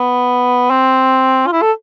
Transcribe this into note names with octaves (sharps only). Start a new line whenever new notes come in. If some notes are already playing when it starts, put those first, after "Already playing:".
Already playing: B3
C4
F4
E4
A4